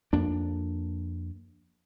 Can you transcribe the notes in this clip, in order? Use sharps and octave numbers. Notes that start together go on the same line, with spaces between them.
F2 A#3 D4